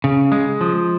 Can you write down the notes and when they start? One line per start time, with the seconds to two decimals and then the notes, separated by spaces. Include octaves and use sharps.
0.04 C#3
0.32 G#3
0.61 F3